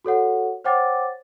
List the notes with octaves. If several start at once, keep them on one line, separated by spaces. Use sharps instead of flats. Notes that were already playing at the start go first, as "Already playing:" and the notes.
F#4 A4 C#5 F#5
C5 C#5 F#5 G5 D6 A6